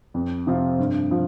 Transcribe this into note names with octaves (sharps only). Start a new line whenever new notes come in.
F2
C3 F3 C4 F4
G2
F3